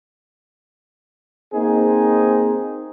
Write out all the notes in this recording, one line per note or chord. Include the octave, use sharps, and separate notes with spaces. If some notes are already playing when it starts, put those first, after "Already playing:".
A#3 C4 D#4 G#4 C5